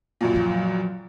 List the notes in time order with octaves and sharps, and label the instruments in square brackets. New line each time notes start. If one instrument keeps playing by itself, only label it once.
[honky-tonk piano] C#2 F#2 A#2
[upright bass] F3 F#3